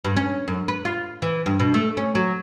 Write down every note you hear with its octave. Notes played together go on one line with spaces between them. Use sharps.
G2
C#4
F#2
B4
F4
E3
G2
B2
A3
C#4
F#3